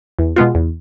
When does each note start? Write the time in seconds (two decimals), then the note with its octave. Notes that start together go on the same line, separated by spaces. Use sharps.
0.19 E2
0.36 B2 G#3 B3 F4
0.55 E2